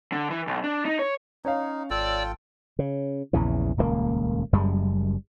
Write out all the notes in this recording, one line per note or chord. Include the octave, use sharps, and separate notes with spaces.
D3
E3
B1
D4
D#4
C#5
C#4 D#4 C#5 F5
G#1 F4 A4 D5 G5 E6
C#3
A#1 E2 C#3 E3
D#1 C#2 C#3 A#3
F#1 F#2 G3 G#3